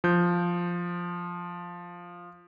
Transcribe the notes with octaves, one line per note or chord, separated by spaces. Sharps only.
F3 G6